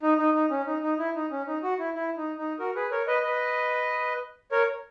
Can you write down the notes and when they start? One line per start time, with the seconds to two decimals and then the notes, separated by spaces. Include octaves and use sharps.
0.03 D#4
0.19 D#4
0.35 D#4
0.51 C#4
0.67 D#4
0.83 D#4
0.99 E4
1.15 D#4
1.31 C#4
1.47 D#4
1.63 F#4
1.79 E4
1.95 E4
2.17 D#4
2.38 D#4
2.59 F#4 A#4
2.75 G#4 B4
2.91 A#4 C#5
3.07 B4 D#5
3.23 B4 D#5
4.51 A#4 C#5